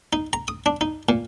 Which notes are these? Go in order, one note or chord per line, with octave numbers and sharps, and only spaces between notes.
D#4
A#5
D#6
D4
D#4
A#2